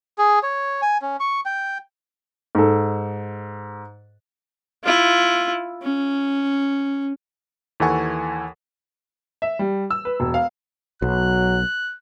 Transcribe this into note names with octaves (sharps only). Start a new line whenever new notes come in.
G#4
C#5
G#5
C#4
C#6
G5
G#2 A4
E4 F4
C#4
D#2 E3 A4 F#5 G#5 C#6
E5
G3
E6
B4
E1
F5
B1 F#3 F#6